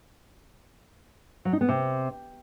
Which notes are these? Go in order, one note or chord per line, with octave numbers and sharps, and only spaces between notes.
F#3
D#4
B3
C3